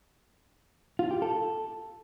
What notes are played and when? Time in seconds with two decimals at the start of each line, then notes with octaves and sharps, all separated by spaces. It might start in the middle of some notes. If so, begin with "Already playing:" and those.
0.99 F4
1.11 G4
1.22 A4